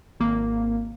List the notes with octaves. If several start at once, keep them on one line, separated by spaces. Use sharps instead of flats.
G#1 A#3